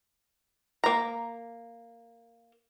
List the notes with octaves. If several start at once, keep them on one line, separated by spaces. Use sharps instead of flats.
A#3 A#5